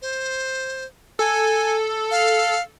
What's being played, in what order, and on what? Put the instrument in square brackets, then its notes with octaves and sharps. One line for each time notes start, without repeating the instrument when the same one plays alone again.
[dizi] C5
[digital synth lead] A4 [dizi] G#5
[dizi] F5